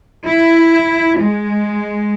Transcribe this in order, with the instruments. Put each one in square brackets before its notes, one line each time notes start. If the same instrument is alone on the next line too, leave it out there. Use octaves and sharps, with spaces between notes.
[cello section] E4
G#3